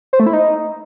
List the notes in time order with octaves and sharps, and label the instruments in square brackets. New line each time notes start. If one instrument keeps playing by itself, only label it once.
[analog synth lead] C5
A3
E4
D#4